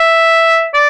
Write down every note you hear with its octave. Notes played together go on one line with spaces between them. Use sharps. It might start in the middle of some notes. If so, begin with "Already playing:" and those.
Already playing: E5
D5